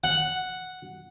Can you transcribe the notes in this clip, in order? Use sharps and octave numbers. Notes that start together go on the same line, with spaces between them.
F#5